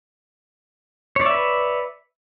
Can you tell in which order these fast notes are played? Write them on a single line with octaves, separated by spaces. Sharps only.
C#5 D5 E5 B4